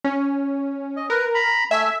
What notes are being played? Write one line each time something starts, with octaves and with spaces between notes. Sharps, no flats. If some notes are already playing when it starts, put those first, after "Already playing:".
C#4
D#5
A#4 B4
A#5 B5
A3 E5 G#5